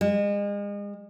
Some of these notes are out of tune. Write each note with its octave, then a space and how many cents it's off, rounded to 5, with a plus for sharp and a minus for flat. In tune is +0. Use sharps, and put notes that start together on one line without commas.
G#3 -35